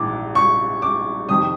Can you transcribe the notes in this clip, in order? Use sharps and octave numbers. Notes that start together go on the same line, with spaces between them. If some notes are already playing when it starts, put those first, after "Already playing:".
Already playing: A#1 G#2 E3 D6
C#6
D6
F2 C3 D#3 D#6